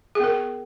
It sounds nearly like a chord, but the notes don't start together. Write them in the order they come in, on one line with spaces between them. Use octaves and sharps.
G#4 B3 A#4